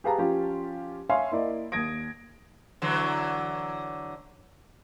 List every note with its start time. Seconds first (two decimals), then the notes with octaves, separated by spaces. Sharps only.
0.04 G4 G#4 B4 F5 A5 A#5
0.18 F3 C#4 F4 G4
1.09 C#5 E5 F5 G#5 C6
1.31 A#3 E4 D5 D#5
1.72 D#2 D#6 G#6 A#6 D7
2.82 D3 E3 F#3